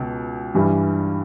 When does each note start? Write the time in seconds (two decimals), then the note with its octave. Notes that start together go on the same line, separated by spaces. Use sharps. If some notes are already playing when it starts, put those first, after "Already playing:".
Already playing: C#2 B2
0.54 G2 E3 G3